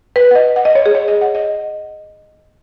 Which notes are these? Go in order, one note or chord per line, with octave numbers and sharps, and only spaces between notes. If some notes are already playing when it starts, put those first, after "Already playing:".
B4
F#5
D#5
F#5
D#5
C#5
G#4
C#5
D#5
F#5
D#5